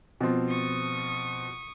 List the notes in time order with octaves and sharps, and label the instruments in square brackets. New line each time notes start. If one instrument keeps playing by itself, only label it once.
[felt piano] B2 F3 C4
[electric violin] C#6 D#6